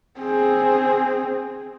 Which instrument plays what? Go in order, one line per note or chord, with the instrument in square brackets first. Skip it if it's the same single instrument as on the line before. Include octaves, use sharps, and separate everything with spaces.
[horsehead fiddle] C4 G#4